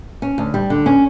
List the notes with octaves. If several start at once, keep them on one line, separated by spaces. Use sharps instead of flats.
C#4
D2
G3
D3
C#4